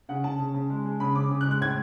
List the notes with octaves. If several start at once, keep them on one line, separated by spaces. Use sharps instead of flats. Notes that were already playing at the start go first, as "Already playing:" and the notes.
C#3 F#5
C#3 A5
C#3
C#3
G#3
G#3
C#3 B5
C#3 D6
C#3
F#6
G#3
F#6
A2 G#6